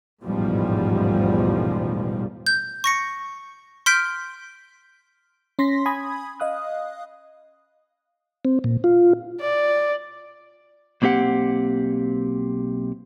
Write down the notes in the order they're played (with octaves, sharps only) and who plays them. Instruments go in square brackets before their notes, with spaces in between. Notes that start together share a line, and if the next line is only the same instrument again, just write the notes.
[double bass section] A1 E2 G#2 B2 F3 G3
[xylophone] G6
C#6 A#6 C#7
C6 F6 G6 B6 D7
[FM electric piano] C#4 C6 A#6 B6
G#5 B5 D#6 G#6
D#5 F5 D#6 F#6
[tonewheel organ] C4
A#2
F4
[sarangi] D5
[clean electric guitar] B1 A#3 C4 G4 F#5